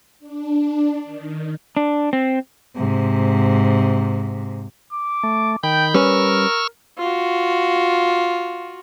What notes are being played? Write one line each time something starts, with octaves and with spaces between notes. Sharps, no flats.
D4
D#3
D4
C4
G#2 C3
D6
A3
D#3 G5 B5 G6
G3 C#4 A#4 B4 C#6 E6 F6
F4 F#4